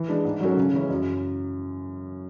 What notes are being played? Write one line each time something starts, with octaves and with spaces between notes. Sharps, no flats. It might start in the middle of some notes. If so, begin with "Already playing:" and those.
Already playing: E3
G#3 D4
G#2
F#3 C#4 F#4 A4
C#3
E3 G#3 C#4 E4
F#2